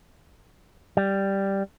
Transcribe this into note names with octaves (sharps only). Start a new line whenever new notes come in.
G3